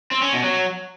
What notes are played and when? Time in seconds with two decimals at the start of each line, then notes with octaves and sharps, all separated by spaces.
0.11 C4
0.22 C#4
0.33 B2
0.43 F#3